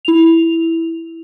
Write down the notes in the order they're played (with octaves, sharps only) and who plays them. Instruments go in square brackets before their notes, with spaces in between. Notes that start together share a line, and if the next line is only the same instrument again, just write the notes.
[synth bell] E4 F7